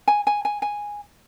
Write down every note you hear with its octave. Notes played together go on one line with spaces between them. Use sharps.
G#5
G#5
G#5
G#5